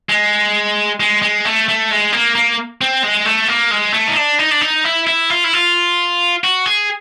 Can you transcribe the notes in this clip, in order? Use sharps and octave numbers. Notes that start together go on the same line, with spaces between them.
G#3
G#3
G#3
A3
A3
G#3
A#3
A#3
C4
G#3
A3
A#3
G#3
A3
D#4
D4
D#4
D4
D#4
E4
E4
F4
E4
F4
F#4
G#4